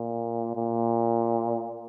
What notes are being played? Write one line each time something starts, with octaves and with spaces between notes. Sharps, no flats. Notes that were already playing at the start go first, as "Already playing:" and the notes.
Already playing: A#2
A#2